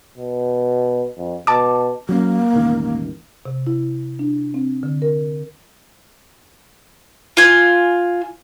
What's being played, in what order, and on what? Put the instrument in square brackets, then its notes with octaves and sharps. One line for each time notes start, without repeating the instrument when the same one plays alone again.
[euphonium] B2
F2
[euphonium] B2 [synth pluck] A5 D6
[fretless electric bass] F#3 C#4 [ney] A#3
[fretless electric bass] E1 A1 D#3
[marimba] C3
E4
D4
C4
D3
A#4
[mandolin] F4 G#5